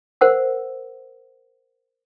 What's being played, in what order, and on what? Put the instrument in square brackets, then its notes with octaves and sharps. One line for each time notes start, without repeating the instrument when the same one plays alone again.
[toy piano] A#4 C5 F#5 E6